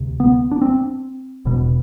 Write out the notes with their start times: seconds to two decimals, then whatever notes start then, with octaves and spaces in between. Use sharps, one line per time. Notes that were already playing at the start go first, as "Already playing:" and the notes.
Already playing: D2 C3
0.20 B3
0.51 D4
0.62 C4
1.45 E1 E2 B2